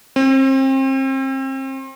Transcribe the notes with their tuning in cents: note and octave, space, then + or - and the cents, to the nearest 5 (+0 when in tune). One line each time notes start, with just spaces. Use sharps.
C4 +35